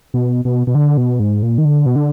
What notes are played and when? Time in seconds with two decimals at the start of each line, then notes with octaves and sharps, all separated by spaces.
0.14 B2
0.45 B2
0.67 B2
0.75 D3
0.97 B2
1.20 G#2
1.43 A#2
1.58 D#3
1.65 D3
1.86 B2
1.96 D3